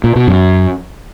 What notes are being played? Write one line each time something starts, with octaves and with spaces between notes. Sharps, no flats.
A#2
B2
F#2